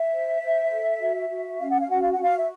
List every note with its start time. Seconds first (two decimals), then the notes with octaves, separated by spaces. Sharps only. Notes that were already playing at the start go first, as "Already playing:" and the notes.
Already playing: E5
0.13 C5
0.42 C5
0.71 A4
1.00 F#4
1.30 F#4
1.59 C#4 F5
1.70 F#5
1.80 F5
1.89 F#4 F#5
2.01 F5
2.12 F#5
2.18 F#4
2.23 F5
2.39 E5